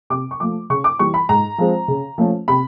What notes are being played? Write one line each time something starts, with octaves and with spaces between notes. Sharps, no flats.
C3 D6
C#6
F3 A3 D6
C#3 C#6
D6
E3 G3 C#6
B5
G#2 A#5
F3 G#3 C4
C#3
F3 A3 C#4
C3 B5